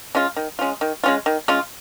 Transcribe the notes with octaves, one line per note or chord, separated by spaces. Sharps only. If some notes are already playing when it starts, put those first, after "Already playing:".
G#3 C#4 F4
D#3
G#3 C#4 F4
D#3
G#3 C#4 F4
D#3
G#3 C#4 F4